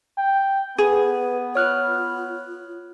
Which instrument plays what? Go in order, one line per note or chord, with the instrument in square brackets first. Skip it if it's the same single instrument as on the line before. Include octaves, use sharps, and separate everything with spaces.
[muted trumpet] G5
[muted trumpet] B3 [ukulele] G#4 [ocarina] B4
[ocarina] F4 [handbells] C#5 F6 F#6